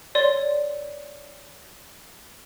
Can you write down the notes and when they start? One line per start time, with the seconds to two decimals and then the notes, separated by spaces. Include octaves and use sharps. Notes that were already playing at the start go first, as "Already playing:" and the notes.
0.15 C#5 D5 C6